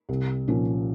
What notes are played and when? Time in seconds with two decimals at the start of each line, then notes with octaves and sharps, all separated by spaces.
0.09 C2
0.48 A#2 F3 A#3 C#4